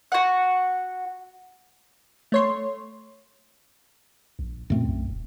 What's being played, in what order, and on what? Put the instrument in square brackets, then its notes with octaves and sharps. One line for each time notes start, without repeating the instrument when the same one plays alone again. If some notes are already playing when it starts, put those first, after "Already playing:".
[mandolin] F#4 F#5
[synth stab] A3 C#5 C6
[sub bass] A#1
[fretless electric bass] F#2 A3 C4 [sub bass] A#2
[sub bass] B1
D#1